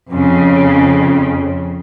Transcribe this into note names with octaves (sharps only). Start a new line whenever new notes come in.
F2 C#3